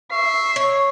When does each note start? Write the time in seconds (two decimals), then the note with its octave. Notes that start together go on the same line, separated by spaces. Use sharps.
0.11 E5 C#6 C7
0.56 C#5